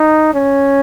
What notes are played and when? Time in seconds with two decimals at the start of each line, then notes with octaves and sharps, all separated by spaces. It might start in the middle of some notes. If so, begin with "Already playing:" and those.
Already playing: D#4
0.34 C#4